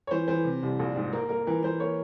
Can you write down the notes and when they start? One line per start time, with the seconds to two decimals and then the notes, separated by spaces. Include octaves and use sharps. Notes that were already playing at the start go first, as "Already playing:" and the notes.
0.07 C#5
0.11 E3 C5
0.28 E3 C5
0.45 C3
0.63 C2
0.79 A#1
0.96 G#2
1.13 A#3 A#4
1.29 A#3 A#4
1.47 E3 A#4
1.63 E3 C5
1.80 A#3 C#5